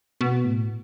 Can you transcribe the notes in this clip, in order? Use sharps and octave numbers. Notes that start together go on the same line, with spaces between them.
B2
A2